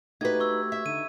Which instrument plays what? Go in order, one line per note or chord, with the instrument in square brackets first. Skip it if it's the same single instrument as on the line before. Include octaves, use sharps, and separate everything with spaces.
[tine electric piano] A3 F#4 G4 [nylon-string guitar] D#4 B4 [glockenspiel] G#6
[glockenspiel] C#6 E6
[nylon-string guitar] E5
[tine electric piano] D3 D#4 [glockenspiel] D#7